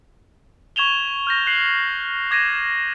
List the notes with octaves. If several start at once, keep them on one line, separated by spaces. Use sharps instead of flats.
C#6 G#6 E7 F7 G7
F6 G6 A#6
F#6 C7 F#7
D6 G#6 A#6 D#7 E7